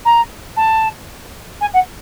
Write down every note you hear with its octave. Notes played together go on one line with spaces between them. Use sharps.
A#5
A5
G#5
F#5